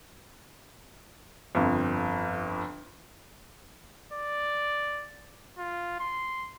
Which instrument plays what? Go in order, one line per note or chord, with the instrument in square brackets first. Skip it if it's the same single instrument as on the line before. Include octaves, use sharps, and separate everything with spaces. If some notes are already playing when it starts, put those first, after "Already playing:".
[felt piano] G1 F2
[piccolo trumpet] D5
F4
C6